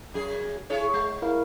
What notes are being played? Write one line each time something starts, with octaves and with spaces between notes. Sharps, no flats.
F#2 G#4
E4 G#4 C#5
G#3
E4 A#4 F5